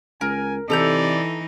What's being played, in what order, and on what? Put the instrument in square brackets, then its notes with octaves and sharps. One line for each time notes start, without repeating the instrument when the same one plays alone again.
[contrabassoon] C#2 [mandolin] A#4 [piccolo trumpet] G#5
[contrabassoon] C3 [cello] E3 D#4 [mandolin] A4 A#5 G6 [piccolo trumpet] D5